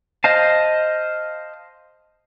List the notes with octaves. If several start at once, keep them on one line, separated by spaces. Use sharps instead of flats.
C5 D#5 F5 A5